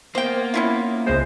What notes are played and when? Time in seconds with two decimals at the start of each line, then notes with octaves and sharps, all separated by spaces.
0.15 A#3 B3 C5 G5
0.54 C#4 E4 F4
1.06 C#2 G#3 C5